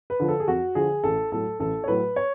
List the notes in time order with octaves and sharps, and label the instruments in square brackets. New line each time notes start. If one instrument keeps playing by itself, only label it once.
[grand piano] B4
D3 F3
A4
G#4
F2 F#4
D3 F3 G#4
A1 A4
A2 F#3 A4
A1 A4
C#5
A2 F#3 B4
C#5